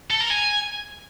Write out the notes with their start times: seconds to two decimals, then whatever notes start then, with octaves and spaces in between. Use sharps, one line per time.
0.10 A4
0.20 A#4
0.30 G#5